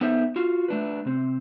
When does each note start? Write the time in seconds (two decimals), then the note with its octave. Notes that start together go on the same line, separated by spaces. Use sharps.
0.01 B3 D#4 A4 C5 E5
0.36 F4 F#4
0.68 A3 D4 B4
1.06 C3 C4